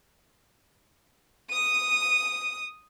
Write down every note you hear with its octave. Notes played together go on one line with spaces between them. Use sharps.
D#6 D#7